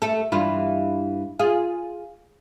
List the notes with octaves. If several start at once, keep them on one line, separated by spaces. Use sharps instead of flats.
A3 A4
G2 E3 F4
F4 G#4